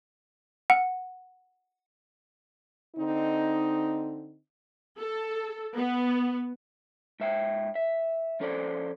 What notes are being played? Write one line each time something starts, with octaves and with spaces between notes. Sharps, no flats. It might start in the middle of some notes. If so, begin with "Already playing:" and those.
F#5
D3 C4 D#4
A4
B3
G#2 E5 G5
E5
F3 C#4 A4 C5 D5